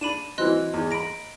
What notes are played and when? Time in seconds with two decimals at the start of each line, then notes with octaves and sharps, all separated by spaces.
0.01 D4 B5 D#7 E7
0.38 E3 F#3 C4 D#5 C6 F#6
0.74 E2
0.91 A#5 B5 A#6 D7